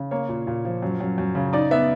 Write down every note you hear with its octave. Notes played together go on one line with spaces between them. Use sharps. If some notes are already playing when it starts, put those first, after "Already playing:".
Already playing: C#3
A#3 C#5
A#2
A#2
F3
F#2
F#2
F#2
C#3
D#4 D5
B3 E5